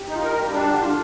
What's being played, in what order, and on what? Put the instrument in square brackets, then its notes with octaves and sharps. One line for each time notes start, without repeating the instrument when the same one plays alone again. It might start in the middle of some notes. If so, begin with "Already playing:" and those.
Already playing: [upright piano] G4
[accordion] D#4
[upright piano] F4
[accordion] A#4
[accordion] G3 [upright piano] G4
[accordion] D4
[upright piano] G4
[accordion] D3
[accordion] D3 [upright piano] F4